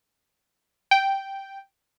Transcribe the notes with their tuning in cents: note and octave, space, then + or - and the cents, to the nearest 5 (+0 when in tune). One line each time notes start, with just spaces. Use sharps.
G5 -5